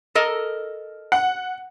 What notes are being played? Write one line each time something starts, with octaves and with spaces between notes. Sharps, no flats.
A4 A#4 D#5
F#5